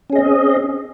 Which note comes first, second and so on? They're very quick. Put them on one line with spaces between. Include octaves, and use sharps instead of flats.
C#4 G#4 D#5 C4